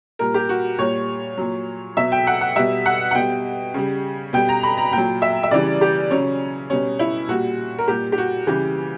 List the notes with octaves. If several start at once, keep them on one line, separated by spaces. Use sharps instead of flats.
A#2 G3 A#4
G4
F#4
A#2 G3 C#5
A#2 F#3
B2 F#3 E5
G5
F#5
F#5
B2 G3 E5
F#5
F#5
B2 G3 G5
C#3 G3
B2 G3 G5
A#5
B5
A#5
A#2 F#3 G5
E5
E5
C#3 E3 G3 D5
G4
C#3 F#3 C#4
B2 G3 C#4
E4
A#2 G3 F#4
A#4
A#2 G3 G4
G4
F#4
C#3 E3 G3 G4